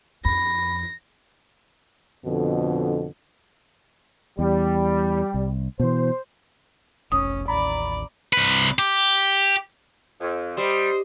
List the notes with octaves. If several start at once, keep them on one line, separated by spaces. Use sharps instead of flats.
F2 B5 A#6
F2 B2 D3
E2 G3
C2
B2 E3 C5
F1 B1 C#4 D#6
A1 D#2 D5 A#5 B5
C2 B4
G4
F2
G3 C5 D#5